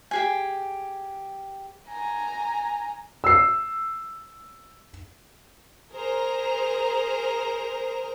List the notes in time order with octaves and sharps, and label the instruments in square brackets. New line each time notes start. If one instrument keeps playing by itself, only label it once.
[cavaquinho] G4 G#4 G#5
[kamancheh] G#5 A#5
[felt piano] E6 C7
[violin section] G#4 A#4 C5 A#5